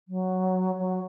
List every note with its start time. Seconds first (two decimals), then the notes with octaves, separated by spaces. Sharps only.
0.08 F#3
0.78 F#3